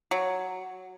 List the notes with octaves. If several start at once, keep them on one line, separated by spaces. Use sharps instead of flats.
F#3